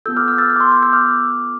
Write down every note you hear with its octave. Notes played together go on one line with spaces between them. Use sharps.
B3 F4 A4 E6 G6
D6 F6
E6 G6
F6 A6
E6 G6
D6
C6 E6
E6 G6
E6 G6
D6 F6